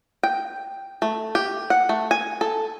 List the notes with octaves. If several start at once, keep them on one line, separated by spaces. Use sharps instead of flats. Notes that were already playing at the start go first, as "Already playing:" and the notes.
G5
A3
G4
F#5
A3
G#5
A4